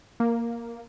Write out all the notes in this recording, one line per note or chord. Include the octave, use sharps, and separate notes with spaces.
A#3